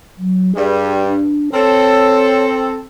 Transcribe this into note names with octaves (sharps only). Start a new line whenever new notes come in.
F#3
G2 G3 G#4
D4
C4 A4 C#5